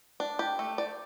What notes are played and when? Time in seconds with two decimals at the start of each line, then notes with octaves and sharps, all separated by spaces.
0.20 D4
0.39 G4
0.59 A3
0.78 D5